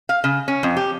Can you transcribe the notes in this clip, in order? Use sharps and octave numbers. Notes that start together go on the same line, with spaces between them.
F5
C#3
C#4
F2
G4